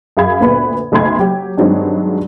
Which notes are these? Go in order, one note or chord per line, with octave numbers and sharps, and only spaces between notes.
F#2 G#4 F5 B5 G#6
D2 A#2 B3 B4 B5
F#1 B1 A3 B5 C6 G#6
F#3 G4
G2 D#3 F#3 G#3 C4 D4